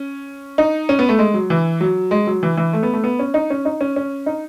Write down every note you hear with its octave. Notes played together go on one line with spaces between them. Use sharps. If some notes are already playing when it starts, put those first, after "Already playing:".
Already playing: C#4
D#4
C#4
B3
A3
G#3
F#3
E3
F#3
G#3
F#3
E3
E3
A3
B3
A3
B3
C#4
D#4
C#4
D#4
C#4
C#4
D#4